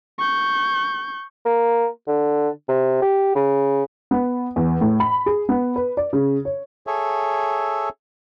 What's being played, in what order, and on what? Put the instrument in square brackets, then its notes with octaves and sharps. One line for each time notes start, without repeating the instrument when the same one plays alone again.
[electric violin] C#6 G6
[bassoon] A#3
D3
C3
G4
C#3
[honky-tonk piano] B3
E2
A2
B5
G#4
B3
B4
D5
C#3
C#5
[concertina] G#4 A4 C#5 E5